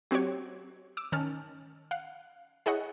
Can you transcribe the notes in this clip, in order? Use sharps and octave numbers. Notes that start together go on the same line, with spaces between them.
F#3 C4 F#4 G4 C#5
D6 E6
D#3 C#4 A5 F6
F5 F#5
E4 G#4 C#5 D#5 F#5